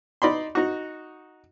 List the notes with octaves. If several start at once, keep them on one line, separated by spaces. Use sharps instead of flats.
D#4 D5 B5 C6
D#4 F#4